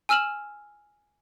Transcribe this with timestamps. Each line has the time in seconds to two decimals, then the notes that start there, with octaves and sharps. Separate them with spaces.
0.09 G#5 E6 F6 E7 F#7